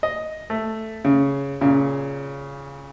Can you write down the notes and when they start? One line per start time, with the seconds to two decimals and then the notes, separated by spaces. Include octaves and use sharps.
0.03 D#5
0.50 A3
1.05 C#3
1.61 A#2 C#3